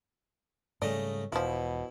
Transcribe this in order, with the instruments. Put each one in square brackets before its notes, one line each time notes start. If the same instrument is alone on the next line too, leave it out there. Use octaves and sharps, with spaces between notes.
[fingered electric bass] G#2 G3 [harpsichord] C#3 A3 D#5 [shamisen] D5
[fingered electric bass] E1 [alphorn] B2 [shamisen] E3 F3 [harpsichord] E4